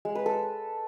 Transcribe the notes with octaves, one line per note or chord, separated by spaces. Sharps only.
G#3
B4
A4